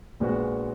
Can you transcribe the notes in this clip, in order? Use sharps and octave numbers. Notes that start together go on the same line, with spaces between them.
A#1 A#2 G#3 B3 F#4